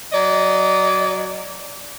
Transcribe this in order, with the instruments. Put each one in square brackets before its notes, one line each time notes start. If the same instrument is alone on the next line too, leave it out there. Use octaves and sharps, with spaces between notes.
[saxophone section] F#3 D5 D#5